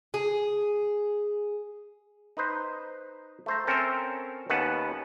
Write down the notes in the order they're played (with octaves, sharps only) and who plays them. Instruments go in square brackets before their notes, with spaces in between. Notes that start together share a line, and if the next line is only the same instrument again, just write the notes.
[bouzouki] G#4
[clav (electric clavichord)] D#4 B4 C5
A3 C5 A#5
C4 C#4 A4 A#4 C5
D#2 B3 C#4 B4 F#5 A5